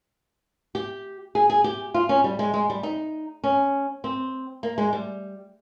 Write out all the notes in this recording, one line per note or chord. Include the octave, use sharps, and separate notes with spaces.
G4
G#4
G#4
G4
F4
C#4
G3
G#3
G#3
G3
D#4
C#4
C4
A#3
G#3
G3